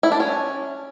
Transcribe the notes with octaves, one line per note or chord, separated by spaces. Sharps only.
E4
D4
C#4